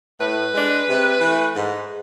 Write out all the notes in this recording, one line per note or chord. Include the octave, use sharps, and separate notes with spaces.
A2 B4
G#3 D4
C3
E3
A3
G#2